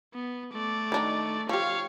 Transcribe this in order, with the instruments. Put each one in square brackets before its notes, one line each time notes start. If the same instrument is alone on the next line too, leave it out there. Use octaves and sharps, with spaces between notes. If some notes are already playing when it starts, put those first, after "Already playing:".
[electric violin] B3
A3 D5
[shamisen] D#3 D4 D#4
[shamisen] F3 G4 [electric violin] C#5 F5